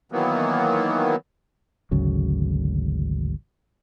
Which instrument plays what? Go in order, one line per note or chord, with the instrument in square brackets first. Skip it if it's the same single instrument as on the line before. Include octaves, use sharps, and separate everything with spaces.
[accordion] D#3 E3 F#3 A#3 B3
[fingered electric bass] G#1 D2 C#3 F#3